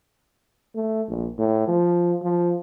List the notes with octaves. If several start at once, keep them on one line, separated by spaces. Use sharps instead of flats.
A3
A#1
A2
F3
F3